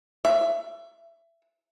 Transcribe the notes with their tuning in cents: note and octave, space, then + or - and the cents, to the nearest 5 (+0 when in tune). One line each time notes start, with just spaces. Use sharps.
E5 +20